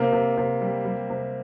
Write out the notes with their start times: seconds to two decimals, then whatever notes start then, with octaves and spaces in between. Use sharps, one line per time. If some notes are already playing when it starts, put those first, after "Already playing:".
Already playing: C3 A#3
0.13 C3
0.38 C3
0.61 G3
0.85 G3
1.10 C3